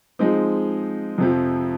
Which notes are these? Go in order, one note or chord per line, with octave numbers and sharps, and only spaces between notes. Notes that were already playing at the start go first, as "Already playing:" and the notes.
F3 G#3 C4 D#4
F2 C3 F3